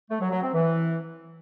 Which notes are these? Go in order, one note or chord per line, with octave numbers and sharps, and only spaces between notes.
A3
F#3
F#3
C4
E3